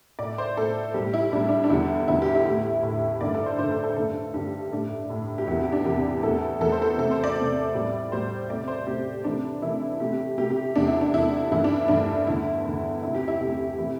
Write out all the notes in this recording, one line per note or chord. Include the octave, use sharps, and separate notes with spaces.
A2 A3 D5
C5
A2 A3 A4
A2 G3 G4
E4
A2 G3 D4
D4
D4
E2 D3 G3 E4
E2 D3 G3 E4
G4
E4
A2 A3
A2 A3
G2 D3 A3 D5
A4
C5
G2 D3 A3 C5
A4
A4
G2 D3 A3 A4
G2 D3 A3 G4
A2 A3 D4
A2 A3
G4
E2 C3 E3 E4
G4
D4
E2 C3 E3 G4
E2 E3 A3 A4
E2 E3 A3 A4
C5
A4
C3 A3 A4
C5
D5
C3 A3
A2 G3
A2 G3 C5
C3 A3 D5
C5
C3 A3 G4
C3 E3 A3 D4
C3 E3 A3 E4
C3 A3 G4
C3 A3 G4
G4
E2 C3 A3 D4
E4
D4
E2 C3 A3 E4
G2 E3 A3 E4
D4
G2 E3 A3 D4
E2 D3 A3 E4
E2 D3 A3
C3 A3 E4
G4
E4
C3 A3 E4
C3 E3 A3